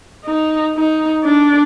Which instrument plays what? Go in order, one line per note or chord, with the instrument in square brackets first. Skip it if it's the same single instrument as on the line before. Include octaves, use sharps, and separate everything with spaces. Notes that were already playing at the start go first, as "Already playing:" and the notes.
[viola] D#4
D#4
D4